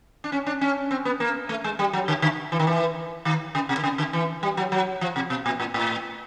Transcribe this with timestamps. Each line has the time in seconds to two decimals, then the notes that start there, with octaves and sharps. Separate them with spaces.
0.24 D4
0.32 C#4
0.47 D4
0.61 C#4
0.91 C4
1.05 B3
1.20 A#3
1.49 A3
1.64 G#3
1.79 G3
1.93 F#3
2.08 D3
2.22 D3
2.52 E3
2.59 D#3
2.67 E3
3.25 D#3
3.55 C#3
3.69 C3
3.77 D3
3.84 C#3
3.98 D3
4.13 E3
4.43 G3
4.57 F#3
4.72 F#3
5.01 F3
5.16 C3
5.30 B2
5.46 A#2
5.60 A2
5.74 A2